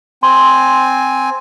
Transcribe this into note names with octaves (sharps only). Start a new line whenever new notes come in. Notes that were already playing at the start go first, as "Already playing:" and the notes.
C4 G#5 C6